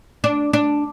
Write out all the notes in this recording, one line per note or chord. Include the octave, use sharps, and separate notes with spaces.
D4
D4